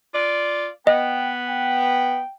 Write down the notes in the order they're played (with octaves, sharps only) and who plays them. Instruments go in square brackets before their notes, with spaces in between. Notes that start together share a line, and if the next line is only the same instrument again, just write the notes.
[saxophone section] F4 D5
[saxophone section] B3 [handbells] D#5 [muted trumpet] G5
[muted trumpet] G5